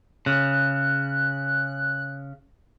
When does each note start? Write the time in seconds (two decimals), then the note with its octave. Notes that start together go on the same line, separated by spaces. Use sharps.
0.26 C#3 F#6